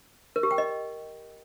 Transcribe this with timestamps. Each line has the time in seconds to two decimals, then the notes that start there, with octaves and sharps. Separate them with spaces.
0.36 A#4
0.43 G4
0.51 G5
0.58 D#5